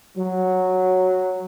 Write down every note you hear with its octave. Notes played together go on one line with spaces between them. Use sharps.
F#3